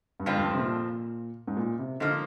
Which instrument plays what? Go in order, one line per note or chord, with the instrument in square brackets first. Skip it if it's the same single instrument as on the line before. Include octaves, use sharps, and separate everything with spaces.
[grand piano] G2
[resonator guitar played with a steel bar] F2 D3 F3 C4 F4 [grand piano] G#2
[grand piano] G2
G2
C3
A#2
G#2
A#2
C3
[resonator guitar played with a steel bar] G#2 F3 A#3 [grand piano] D3